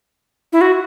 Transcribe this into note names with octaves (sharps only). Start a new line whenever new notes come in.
E4
F#4